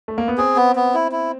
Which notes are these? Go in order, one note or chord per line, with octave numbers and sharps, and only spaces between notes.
A3
A#3
B3
C4 G#4
B3
B3
E4
E4